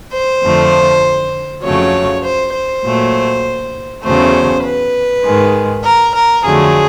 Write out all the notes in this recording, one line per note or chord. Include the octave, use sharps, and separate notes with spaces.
C5
F2 D3 F3 A3
F2 C#3 F#3 A3 C#5
C5
C5
A#2 F#3 A3
E2 C#3 F#3 A3 C5
B4
G#2 D#3 G#3
A#4
A#4
F2 D3 F#3 A3 G#4